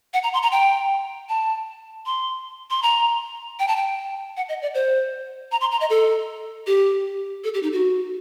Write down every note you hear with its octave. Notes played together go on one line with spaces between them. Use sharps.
F#5
A#5
C6
A#5
G5
A5
C6
C6
A#5
G5
A5
G5
F#5
D#5
D5
C5
A#5
C6
A#5
D#5
A4
G4
A4
G4
D#4
F#4